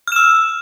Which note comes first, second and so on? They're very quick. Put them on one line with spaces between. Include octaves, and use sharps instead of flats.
F6 E7 E6